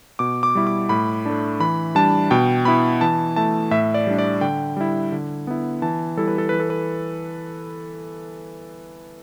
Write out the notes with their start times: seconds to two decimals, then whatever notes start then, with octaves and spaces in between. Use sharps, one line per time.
0.19 B2 D6
0.43 D6
0.55 G3 E4
0.67 D6
0.89 A2 B5
1.26 A3 D4
1.60 E3 B5
1.95 G3 D4 A5
2.31 B2 G5
2.65 B3 E4 B5
3.01 E3 A5
3.36 A3 E4 A5
3.71 A2 E5
3.94 D5
4.07 G3 D4
4.19 D5
4.41 D3 G5
4.77 G3 E4
5.12 D3
5.47 B3 E4
5.82 E3 A5
6.17 G3 E4 A4
6.28 B4
6.38 A4
6.49 E3 B4
6.60 A4
6.70 B4